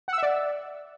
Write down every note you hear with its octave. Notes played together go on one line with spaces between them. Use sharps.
D5 E5 F#5 E6